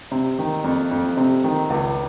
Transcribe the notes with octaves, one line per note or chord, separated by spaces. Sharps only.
C3
D#3
F2
F2
C3
D#3
C#2